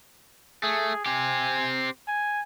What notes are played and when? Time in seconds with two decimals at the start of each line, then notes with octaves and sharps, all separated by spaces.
0.63 A3 G#4
1.06 C4 G4 G#5
2.08 G#5